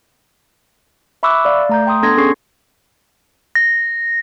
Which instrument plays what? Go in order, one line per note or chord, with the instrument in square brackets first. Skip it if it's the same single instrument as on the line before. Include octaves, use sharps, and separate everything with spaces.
[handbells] E5 B5 C#6 D6 E6 F#6
D5 F5
A3 A#5 G6
G5 C6 D#6
B3 D4 A4 C6 G#6 A#6
C#4 G#4 A4 C#6 C7
[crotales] A#6